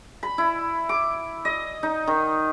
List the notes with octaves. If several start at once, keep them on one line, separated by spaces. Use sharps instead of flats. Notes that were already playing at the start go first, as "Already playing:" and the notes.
B5
E4
D6
D#5
D#4
D#3